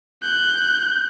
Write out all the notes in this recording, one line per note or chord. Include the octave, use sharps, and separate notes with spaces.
F#6 G6